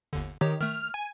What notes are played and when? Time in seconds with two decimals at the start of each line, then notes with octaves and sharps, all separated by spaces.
0.13 G1 D#2 D3
0.41 D#3 G4 C#5
0.61 D#3 A3 F6
0.94 G#5